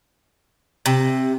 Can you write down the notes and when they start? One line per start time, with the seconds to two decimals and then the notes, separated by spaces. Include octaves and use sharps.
0.86 C3